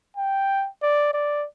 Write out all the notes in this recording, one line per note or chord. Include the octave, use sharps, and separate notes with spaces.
G5
D5
D5